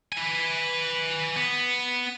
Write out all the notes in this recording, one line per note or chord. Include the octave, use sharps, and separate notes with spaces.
B4 G#5
B3